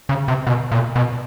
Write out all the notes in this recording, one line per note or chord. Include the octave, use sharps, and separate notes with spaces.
C#3
C3
B2
A#2
B2